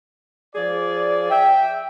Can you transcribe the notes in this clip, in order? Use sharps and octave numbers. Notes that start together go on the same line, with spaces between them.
F3 G#4 D5
E5 G5